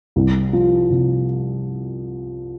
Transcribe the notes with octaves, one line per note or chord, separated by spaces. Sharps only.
C2
F3
C3